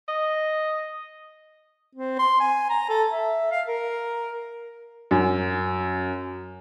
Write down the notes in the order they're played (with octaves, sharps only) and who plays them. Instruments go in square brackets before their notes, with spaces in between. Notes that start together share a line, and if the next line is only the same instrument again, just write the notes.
[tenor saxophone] D#5
[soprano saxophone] C4
C6
G#5
A#5
A4
E5
F5
A#4
[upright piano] F#2